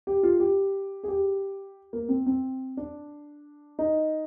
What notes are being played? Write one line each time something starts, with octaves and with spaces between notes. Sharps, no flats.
G4
F4
G4
G#4
G4
A#3
C4
C4
D4
D#4